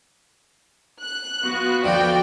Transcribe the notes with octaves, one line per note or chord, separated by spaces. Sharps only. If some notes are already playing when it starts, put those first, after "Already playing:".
F#6
B3 F4 F#4
D2 F3 D5 G5